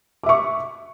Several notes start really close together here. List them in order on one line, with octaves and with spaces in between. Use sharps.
D6 E5 C#6